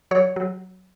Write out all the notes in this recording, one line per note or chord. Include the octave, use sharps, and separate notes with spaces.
F#3 C#5
F#3